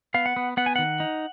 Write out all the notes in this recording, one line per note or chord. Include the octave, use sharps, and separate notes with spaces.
B3 F5
F#5
B3
B3 F#5
G#5
D#3 F#5
D#4